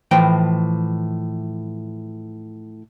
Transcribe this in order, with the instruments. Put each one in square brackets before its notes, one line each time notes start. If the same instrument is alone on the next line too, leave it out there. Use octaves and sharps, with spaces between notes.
[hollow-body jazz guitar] A2 E3 F3 G5